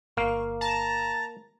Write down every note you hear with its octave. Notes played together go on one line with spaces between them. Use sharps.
G1 A#3 F5 C#6
A5 A#5